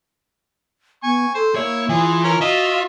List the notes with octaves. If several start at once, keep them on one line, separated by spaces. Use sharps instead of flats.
B3 G#5 C#6
A4 C5
A#3 E4 C#5
E3 F4 G#4
C#4 A#4
F4 F#4 D#5 E5